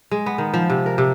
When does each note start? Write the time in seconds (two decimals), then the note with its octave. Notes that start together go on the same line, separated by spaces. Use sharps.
0.11 G#3
0.26 B3
0.38 D#3
0.54 F3
0.70 C3
0.86 A#4
0.98 C3